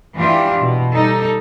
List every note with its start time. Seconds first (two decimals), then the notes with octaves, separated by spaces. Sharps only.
0.15 G#2 E3 D4 F4 G4
0.60 B2
0.92 G3 D#4 A4